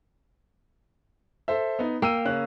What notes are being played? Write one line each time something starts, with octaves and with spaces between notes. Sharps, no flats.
A4 C5 E5
B3 D#4
A#3 G5 E6 D#7
C#3 C#4 F#6